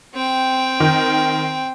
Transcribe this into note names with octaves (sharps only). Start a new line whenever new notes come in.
C4 G5
D#3